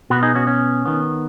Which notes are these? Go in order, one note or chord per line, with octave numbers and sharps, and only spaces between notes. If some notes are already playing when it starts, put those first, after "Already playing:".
B2 B3 F#4 B4
D#4 G#4
C#4 F#4
C#4
D#3 B3